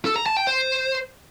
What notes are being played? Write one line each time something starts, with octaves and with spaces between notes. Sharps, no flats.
A4
A#5
A5
G5
C5